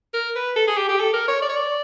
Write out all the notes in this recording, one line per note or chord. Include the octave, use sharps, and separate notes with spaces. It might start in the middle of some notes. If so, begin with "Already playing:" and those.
A#4
B4
A4
G#4
G4
G4
A4
A#4
C#5
D5
C#5
D5